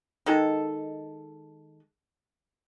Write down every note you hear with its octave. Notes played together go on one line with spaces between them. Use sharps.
D#3 G#3 A4